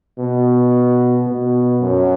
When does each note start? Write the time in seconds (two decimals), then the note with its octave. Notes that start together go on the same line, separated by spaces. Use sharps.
0.19 B2
1.27 B2
1.81 F#2